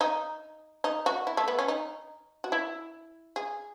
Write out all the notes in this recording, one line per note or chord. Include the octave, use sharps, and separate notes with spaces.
D#4
D#4
F#4
E4
A3
B3
C#4
D#4
F#4
E4
G#4